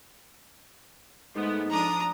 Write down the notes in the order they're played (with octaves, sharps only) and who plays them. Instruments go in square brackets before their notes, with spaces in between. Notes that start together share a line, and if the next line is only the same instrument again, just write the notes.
[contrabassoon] G#2 [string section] G#3 A3 B3
[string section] F3 D4 D#6 [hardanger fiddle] A#5